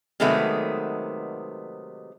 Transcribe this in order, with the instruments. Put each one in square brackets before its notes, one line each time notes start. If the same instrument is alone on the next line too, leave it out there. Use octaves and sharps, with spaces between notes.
[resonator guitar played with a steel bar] C3 D#3 F#3 G#3 A3 B3